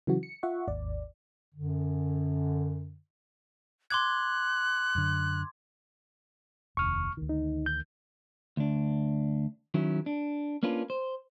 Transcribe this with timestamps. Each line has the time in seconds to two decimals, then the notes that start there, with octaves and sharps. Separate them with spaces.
0.07 C#3 E3 F#3 F#4
0.23 C#7
0.43 F4 E5 F#5 C#6
0.68 G#1 D#2 D5
1.55 F#2 D3
3.91 C6 D6 F#6 G#6
4.95 F#2 D3
6.77 F1 D#2 C#6 F6
7.17 D2 D#3
7.29 D#4
7.66 G6
8.57 D2 D4
9.74 D#3 F#3 C#4 E4
10.06 D4
10.63 A#3 C#4 D4 F4 B4
10.90 C5